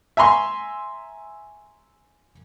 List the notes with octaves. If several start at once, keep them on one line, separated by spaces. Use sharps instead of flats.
E5 G#5 A#5 C6 C#6